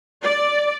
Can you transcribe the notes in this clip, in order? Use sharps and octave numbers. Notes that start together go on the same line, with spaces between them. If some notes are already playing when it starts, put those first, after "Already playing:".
D5